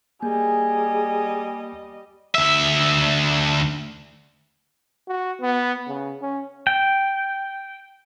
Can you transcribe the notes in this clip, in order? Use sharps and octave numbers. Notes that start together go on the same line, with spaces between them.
G3 A#3 G#4 D#5 G#5
D2 E5
F#4
B3
C#3
C#4
G5